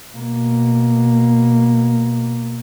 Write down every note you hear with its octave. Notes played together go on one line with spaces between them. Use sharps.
B2 A#3